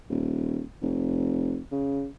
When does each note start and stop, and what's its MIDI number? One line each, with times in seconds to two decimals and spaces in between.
0.10 0.63 27
0.82 1.60 29
1.72 2.07 49